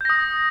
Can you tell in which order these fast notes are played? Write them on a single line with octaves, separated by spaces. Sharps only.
G6 A#6 D#6